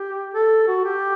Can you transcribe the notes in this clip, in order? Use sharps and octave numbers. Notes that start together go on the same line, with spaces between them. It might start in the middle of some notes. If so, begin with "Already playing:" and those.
Already playing: G4
A4
F#4
G4